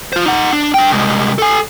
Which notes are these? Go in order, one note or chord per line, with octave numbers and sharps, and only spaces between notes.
F4 C5
D#4 F#5
D4
D4 G5
C2 G#3
A4 G#5